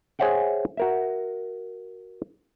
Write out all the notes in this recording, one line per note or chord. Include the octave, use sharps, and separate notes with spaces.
G#4 C5 C#5 E5 F#5 G5
F#4 A#4 E5